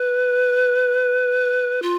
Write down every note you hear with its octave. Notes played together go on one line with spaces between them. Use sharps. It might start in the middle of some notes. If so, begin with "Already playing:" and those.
Already playing: B4
F4